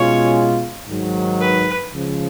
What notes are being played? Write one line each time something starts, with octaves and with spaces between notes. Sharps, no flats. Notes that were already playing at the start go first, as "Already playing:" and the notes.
Already playing: B2 G#3 C#4 F4 C#5
G#2 D#3 F#3
B4
C#2 C#3 F3